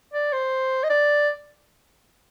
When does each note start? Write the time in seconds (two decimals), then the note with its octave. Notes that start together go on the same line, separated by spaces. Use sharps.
0.14 D5
0.32 C5
0.83 D#5
0.90 D5